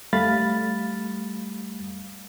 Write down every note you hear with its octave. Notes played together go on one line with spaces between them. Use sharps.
G3 A3 F5 B5 A6